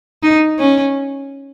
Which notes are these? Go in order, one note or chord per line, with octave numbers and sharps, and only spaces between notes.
D#4
C#4